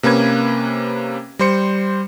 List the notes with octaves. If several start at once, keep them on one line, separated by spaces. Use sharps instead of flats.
C3 A#3 C#4 B4 G#6
G3 C5 C#7